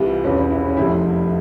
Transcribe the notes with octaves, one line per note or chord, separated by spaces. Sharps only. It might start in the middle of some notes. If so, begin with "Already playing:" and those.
Already playing: C2 C3 E3 G3 F4
E1 E2 E3 G3 C#4
C#4
E4
C#4
F1 F2 C3 G3 E4